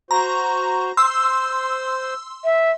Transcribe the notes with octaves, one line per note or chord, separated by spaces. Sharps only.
F#4 C5 A#5
C5 C6 E6
E5